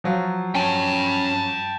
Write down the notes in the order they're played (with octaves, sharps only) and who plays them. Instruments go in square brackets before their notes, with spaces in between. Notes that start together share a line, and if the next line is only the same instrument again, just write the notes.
[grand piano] F3 F#3 F4
[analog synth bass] C#4 [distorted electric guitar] G5 A5